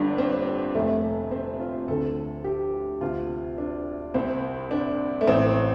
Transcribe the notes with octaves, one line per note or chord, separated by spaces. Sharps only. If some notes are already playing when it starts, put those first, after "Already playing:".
Already playing: G1 G2 D3 D4
C4
F1 F2 C3 A3
C4
F4
D2 D3 A4
G4
D2 C3 F4
D4
C2 C3 C4
D4
A3
A1 A2 C4